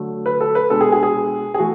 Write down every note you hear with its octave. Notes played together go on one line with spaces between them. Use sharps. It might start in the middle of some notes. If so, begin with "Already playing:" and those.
Already playing: D3 F#3 A3
B4
A4
B4
B2 G#3 D4 A4
G#4
G#4
G#4
G#4
E3 A3 F#4